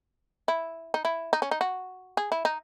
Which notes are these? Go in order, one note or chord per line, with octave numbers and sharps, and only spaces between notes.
E4
D#4
E4
D#4
C#4
D#4
F#4
G#4
E4
D#4